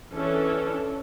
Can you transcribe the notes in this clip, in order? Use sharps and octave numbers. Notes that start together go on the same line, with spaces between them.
E3 C#4 D4 A4